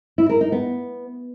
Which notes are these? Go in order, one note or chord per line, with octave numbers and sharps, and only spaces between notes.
E4
A#4
D#4
B3